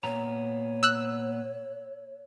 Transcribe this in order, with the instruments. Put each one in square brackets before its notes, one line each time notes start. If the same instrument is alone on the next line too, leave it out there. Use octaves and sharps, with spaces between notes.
[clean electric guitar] A#2 B3 A#5 [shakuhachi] C#5
[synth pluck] E6 F#6